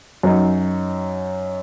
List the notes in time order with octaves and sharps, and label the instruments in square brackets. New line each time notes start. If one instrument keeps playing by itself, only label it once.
[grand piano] F#2 F#3 D#4